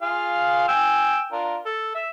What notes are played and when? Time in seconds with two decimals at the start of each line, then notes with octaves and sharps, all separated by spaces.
0.02 F4 G#4 F5
0.68 G5 G#5 E6
1.32 D4 F4 A#4
1.65 A4
1.94 E5